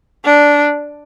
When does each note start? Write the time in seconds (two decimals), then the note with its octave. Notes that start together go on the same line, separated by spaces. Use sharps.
0.25 D4